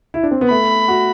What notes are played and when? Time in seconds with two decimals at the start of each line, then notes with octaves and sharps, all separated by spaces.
0.14 E4
0.23 D4
0.31 C4
0.41 B3
0.49 A3 B5
0.88 F#4